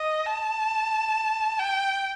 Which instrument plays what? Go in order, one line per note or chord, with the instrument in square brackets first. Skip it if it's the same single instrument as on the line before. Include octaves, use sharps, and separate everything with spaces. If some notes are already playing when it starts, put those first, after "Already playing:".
Already playing: [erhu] D#5
A5
G5